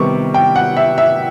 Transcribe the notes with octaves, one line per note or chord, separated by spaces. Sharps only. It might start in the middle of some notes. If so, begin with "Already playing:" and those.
Already playing: C3 D#3 G3 B3 C#6 D6
G5
F#5
E5
E5